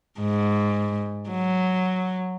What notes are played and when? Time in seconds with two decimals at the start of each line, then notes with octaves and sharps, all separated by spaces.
0.20 G#2
1.30 F#3